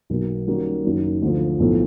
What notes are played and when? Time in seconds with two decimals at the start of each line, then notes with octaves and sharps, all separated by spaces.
0.10 B1 B2 F#3 A#3
0.47 D#3 G3 A#3 C#4 F#4
0.84 F#1 F#2 D#3 F#3
1.22 D2 D3 F3
1.60 B1 A2 F3 A3